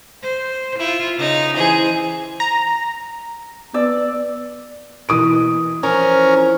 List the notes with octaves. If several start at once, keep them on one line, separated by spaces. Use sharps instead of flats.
C5
E4 F4
C#3 D#4
E3 G#4 C5
A#5
B3 D5 E6
B2 E3 A#3 D#6 D7
F3 C#4 A#4